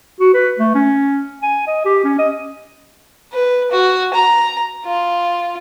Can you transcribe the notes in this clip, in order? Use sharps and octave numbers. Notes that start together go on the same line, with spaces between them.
F#4
B4
A3
C#4
G#5
D#5
G4
C#4
D#5
B4
F#4
A#5
F4